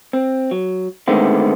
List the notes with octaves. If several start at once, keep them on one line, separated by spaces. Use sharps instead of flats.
C4
F#3
D3 D#3 G#3 A3 B3 C4